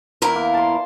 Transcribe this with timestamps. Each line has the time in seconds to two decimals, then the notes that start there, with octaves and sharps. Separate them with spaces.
0.22 E2 E4 A#4
0.35 A#3
0.54 A5 C6